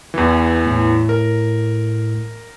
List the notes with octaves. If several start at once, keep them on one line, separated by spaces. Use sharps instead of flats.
E2 E3
A2
A#4